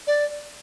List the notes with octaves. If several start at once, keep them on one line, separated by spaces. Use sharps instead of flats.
D5